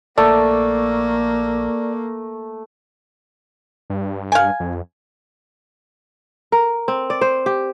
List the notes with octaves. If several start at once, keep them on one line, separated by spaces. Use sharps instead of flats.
A#1 A3 A#3 D5
G2
F5 G#5
F2
A#4
C4
D5
C5
G4